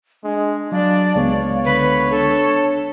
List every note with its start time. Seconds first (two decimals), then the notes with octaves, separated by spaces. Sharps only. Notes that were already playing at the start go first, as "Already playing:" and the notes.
0.24 G#3 D4
0.72 F#3 D4 D5 F5
1.16 C#2 G#3 B3 C#5
1.65 D3 B4
2.10 D4 A4